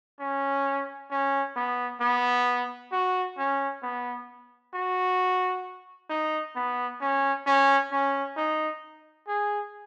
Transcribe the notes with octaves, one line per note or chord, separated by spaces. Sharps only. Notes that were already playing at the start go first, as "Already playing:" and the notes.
C#4
C#4
B3
B3
F#4
C#4
B3
F#4
D#4
B3
C#4
C#4
C#4
D#4
G#4